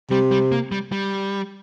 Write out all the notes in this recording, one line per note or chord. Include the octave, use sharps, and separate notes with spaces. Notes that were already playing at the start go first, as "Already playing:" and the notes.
C3 G3
G3
A#3
G3
G3